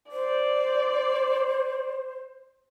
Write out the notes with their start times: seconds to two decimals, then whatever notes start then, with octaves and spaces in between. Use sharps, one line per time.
0.11 C5 D5